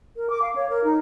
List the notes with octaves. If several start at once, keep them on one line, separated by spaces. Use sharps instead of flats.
A#4
D6
F5
C#5
A#4
D#4